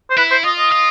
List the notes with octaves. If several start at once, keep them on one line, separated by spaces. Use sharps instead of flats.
C5
E4 B4
C5
F4 D#5
D#5
F4